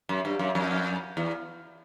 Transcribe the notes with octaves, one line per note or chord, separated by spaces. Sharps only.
F#2
G2
F#2
F2
E2